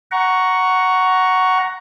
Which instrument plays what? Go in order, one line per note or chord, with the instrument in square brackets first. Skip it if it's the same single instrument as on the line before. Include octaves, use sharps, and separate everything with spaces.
[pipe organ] F#5 A#5 C#6